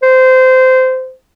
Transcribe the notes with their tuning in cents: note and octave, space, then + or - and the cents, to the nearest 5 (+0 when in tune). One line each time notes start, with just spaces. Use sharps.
C5 -20